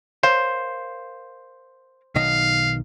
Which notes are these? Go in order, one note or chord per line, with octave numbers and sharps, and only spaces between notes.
A#4 C5 C#5 F5
B1 D#3 D#5 F5